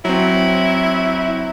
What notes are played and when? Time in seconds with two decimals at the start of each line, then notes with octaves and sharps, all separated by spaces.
0.05 F#3 C4 E4